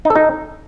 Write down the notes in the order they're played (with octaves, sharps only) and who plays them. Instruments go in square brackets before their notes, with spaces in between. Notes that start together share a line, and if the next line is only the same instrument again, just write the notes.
[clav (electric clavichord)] D#4
A4
D#4